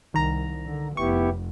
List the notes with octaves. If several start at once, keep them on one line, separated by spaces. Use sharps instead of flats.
C2 D#3 A#5
D3
F1 B3 E4 G4 C#6